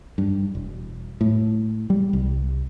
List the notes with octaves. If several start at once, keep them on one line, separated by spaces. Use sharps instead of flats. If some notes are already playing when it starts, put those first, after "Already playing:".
G2
E1
A2
G3
C2